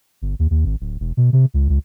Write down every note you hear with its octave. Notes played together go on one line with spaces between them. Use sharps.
G1
D#2
D#2
G#1
D1
E1
B2
C3
C#2
C#2